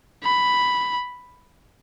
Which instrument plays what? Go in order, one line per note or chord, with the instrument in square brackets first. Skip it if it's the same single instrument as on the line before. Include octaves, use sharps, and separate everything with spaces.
[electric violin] B5